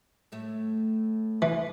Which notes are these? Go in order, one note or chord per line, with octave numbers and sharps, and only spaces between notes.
A2 A3 E5
E3